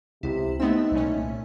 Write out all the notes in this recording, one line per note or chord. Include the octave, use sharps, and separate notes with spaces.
C#2 C3 E4
A3 B3 C4 D#4 E5
C2 A#2 C#4